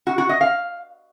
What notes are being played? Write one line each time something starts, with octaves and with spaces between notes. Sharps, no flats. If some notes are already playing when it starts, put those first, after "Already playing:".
F#4
F#4
D#5
F5